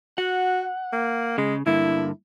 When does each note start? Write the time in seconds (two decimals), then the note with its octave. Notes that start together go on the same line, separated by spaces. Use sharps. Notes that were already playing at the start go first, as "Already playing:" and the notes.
0.18 F#4 F#5
0.93 A#3
1.38 C#3 G#3
1.66 G2 D3 A#3 E4